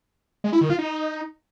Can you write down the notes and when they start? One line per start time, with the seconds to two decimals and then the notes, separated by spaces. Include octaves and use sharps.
0.44 G#3
0.53 E4
0.61 D#3
0.70 F4
0.78 D#4